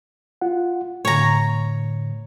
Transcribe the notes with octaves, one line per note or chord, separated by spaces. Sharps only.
F4 F#5
A2 D3 C#5 A#5